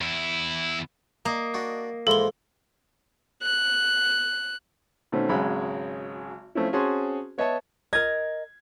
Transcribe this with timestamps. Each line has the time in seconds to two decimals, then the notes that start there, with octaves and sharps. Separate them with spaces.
0.01 E2 E4
1.25 A#3 D#5
1.54 D4 F#4
2.07 G#2 E3 F3 A4 G7
3.43 F#6
5.12 B2 D#3 A3 C4 C#4
5.29 G#1 C#3 F#3 G#3 B5
6.55 F3 A3 C4 C#4 E4
6.73 C4 C#4 F#4 G#4 A5 C6
7.38 B3 C#5 D#5 E5 A5
7.93 A#4 D#5 G#6